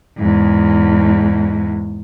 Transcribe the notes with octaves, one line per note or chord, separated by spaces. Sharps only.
E2 G#2